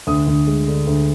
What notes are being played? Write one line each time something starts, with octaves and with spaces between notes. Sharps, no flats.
D2 D#6
D2
G#3
D3
D2